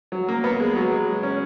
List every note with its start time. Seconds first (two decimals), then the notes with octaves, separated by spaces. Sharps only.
0.12 F#3
0.28 A#3
0.44 B3
0.60 G#3
0.76 F#3
0.91 G#3
1.23 C#4